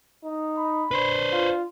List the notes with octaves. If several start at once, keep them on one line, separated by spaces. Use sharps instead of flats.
D#4
B5
D4 B4 C5
F4